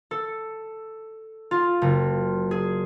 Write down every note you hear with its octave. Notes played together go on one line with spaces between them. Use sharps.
A4
F4
F#1
G#4